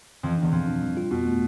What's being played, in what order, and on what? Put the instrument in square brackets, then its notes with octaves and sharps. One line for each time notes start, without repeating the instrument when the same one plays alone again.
[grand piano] F2 [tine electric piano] E3
[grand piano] E2 [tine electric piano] D4
[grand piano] F2 [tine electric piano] B2
[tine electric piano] D4
G3
F4
[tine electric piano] F2 [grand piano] B2
[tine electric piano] A3